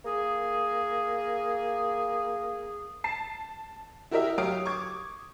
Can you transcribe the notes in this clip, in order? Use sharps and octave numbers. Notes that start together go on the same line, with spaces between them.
A#3 G#4
A5 C7
E4 F#4 G4 A#4 D#5 E5
F#3 G4 C#5 F5 D#6 D7
C#6 D6 G#6